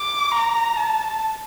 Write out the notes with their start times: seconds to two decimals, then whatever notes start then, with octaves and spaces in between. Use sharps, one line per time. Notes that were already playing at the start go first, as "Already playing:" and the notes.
Already playing: D6
0.32 A#5
0.77 A5